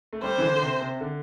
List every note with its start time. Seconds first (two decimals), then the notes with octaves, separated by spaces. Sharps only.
0.13 A3
0.23 G3 C5
0.38 E3
0.42 D3
0.56 D3
0.62 C3
0.81 C3
1.00 D3